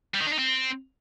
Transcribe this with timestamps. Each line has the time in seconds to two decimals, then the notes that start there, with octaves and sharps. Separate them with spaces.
0.14 G3
0.20 D#3
0.26 D4
0.32 D#4
0.38 C4